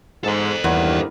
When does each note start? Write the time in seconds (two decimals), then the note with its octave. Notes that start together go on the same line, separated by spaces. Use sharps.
0.24 G#2 A4 C5
0.64 E2 G2 D#3 A#3